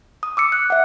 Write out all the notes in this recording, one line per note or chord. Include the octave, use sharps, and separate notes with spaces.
D#6
D6 E6 C#7
F#6
E5 F#5